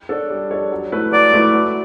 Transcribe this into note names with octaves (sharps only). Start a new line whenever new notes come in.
D4 A4 C#5
G3
D4 A4 C#5
F#3
A3 E4 B4
F#3 D5
A3 E4 B4
F#3